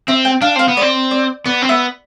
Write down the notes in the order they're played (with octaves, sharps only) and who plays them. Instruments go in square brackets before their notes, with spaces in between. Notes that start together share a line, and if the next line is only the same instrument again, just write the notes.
[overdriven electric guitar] C4 [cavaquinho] E5
[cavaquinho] G5
[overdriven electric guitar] D4 [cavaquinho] F5
[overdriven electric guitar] C4 [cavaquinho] F5
[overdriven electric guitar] B3
[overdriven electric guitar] C4 [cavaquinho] D5
[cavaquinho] D5
[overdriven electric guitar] B3 [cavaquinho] D5
[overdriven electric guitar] C4
[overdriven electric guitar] B3 [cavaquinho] E5